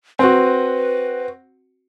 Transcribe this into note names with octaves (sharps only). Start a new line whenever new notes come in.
C4 F#4 B4